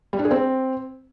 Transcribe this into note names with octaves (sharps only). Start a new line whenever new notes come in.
G3
D4
G#4
C4